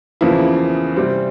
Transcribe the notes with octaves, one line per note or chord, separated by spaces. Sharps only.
E2 C#3 F3 A#3 E4
C3 G3 C4